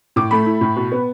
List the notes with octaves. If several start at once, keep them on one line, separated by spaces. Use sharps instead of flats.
A2 D6
A3 B5
E4
A2
B2
B3